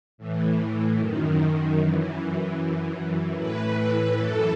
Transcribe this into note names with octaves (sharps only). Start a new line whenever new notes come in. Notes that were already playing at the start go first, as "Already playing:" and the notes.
A2 E3
F#2 D#3
F#2 E3
F#2 E3
A2 E3 B4
F#2 E3 A4